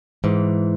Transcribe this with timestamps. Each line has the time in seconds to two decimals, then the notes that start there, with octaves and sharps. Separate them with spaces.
0.24 G#2 E3